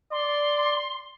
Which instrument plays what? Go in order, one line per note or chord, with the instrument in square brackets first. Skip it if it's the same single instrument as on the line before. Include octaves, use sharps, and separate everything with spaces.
[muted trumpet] D5 [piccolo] C6